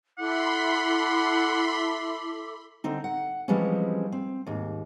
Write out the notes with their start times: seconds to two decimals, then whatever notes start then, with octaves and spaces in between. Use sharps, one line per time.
0.18 E4 A4 E5 F#5 B5 C6 D6
2.84 D3 C4 D#4
3.04 F#5
3.48 E3 F3 G3 G#3 C4 C#4
4.12 C4
4.46 D#2 G#2